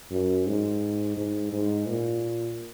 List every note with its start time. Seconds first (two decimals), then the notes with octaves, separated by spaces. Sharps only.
0.11 F#2
0.46 G#2
1.17 G#2
1.52 G#2
1.88 A#2